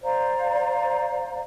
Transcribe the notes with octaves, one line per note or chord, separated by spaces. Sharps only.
C5 D5 F5 A#5